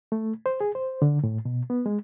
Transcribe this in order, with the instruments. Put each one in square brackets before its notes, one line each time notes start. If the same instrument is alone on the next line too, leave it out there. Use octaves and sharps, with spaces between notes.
[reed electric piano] A3
C5
G#4
C5
D3
A2
B2
B3
G#3